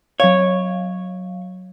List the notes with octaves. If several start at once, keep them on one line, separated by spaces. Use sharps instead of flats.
F#3 C#5 F5